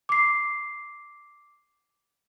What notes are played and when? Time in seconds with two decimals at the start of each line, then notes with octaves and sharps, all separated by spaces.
0.09 D6 C7